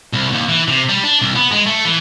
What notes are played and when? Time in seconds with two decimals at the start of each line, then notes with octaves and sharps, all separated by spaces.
0.13 C2
0.33 D#2
0.49 E3
0.68 C3
0.89 G3
1.04 D4
1.22 C2
1.36 B3
1.52 G#3
1.66 A3
1.85 E3